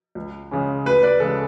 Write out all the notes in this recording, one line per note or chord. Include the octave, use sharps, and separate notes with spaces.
C#2
C#3 G#3 C#4
D2 B4
B4 D5
C#3 G#3 A4